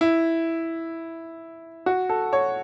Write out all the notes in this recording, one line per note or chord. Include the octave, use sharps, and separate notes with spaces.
E4
F#4
A4
C#5